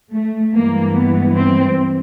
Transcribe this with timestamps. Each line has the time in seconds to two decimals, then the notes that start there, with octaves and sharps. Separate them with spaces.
0.13 A3
0.54 G2 E3 G#3 A#3
0.95 B3
1.36 C4